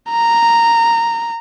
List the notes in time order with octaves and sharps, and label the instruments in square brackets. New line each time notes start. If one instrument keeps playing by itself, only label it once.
[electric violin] A#5